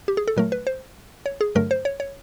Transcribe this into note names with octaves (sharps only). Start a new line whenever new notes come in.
G4
G#4
A4
A#2 F#3 A3 A#4
B4
C5
C#5
G#4
G2 D3 F#3 A3 A#4
C5
C#5
C#5